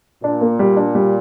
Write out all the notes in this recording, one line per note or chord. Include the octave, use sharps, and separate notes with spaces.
A#2 D4
A#3
G3
D4
G3